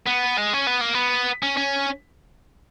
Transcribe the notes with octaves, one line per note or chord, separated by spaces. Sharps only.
B3
G#3
C#4
B3
A#3
B3
C#4
C#4